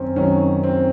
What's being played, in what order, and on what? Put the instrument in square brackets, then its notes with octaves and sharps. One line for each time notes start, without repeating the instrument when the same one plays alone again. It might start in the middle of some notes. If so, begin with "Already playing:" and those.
Already playing: [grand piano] F#2 D#3 C4 C#4
F#2 D#3 F#3 C#4
C4